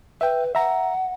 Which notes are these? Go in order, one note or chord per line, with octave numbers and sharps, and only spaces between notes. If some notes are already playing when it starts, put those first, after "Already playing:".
B4 E5 G5
E5 F#5 A#5